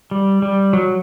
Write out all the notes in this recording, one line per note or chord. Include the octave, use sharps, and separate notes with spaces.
G3
G3
F#3